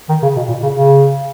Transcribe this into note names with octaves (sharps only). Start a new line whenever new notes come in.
D#3
C#3
B2
A#2
C#3
C#3